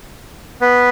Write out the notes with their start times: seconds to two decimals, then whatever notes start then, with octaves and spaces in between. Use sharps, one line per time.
0.61 B3 B4